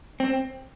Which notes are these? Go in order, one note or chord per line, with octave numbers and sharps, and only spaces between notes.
C4